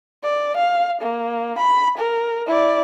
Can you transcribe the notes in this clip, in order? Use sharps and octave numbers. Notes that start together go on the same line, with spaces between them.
D5
F5
A#3
B5
A#4
E4 D5